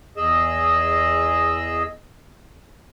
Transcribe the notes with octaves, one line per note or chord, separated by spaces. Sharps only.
E2 G#4 D#5 E6